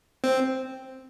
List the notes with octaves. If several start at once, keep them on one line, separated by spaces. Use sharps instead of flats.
C4